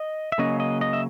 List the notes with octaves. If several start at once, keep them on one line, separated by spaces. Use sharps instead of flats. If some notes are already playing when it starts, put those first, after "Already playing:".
Already playing: D#5
E5
C#3 F#3 A#3 C#4 D#5
D#5
D#5
E5